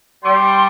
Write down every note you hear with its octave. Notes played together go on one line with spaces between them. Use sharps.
G3 C6